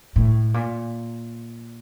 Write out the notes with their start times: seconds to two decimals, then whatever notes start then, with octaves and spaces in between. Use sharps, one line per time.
0.16 A2
0.54 A#2